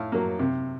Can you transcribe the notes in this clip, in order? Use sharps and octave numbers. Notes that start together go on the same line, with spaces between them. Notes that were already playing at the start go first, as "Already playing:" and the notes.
Already playing: A2 F5
F#3 A#3
C3